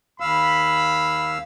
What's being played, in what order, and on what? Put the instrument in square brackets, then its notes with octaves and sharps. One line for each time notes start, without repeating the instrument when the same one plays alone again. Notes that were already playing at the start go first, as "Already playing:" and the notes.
[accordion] D#2 F5 E6 [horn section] B5